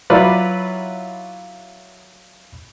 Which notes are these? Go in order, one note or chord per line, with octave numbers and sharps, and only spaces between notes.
F#3 E4 F4 B4 D5